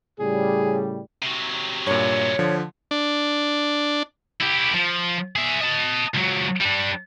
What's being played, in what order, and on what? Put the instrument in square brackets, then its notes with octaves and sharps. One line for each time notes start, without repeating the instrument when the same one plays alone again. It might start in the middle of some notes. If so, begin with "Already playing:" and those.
[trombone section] A2 C#3 G3 [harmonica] G#4
[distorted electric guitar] C3 F#3
[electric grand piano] G2 A#2 [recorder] C#5
[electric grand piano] D3 F3
[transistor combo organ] D4
[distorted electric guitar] E4 G4
F3
G#4 E5
D#5 A5
C#2 F#3
G3 D4